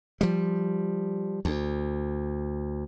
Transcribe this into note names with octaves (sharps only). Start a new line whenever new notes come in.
F3 G3
D2